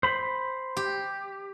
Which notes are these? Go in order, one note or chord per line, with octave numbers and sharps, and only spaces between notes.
C5 B5
G4